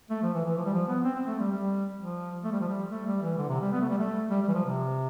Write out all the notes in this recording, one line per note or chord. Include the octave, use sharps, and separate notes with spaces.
A3
F3
E3
E3
F3
G3
F3
B3
C4
C4
A3
G3
G3
F3
A3
G3
F3
G3
A3
G3
E3
D3
C3
G3
B3
A3
G3
A3
G3
G3
E3
F3
C3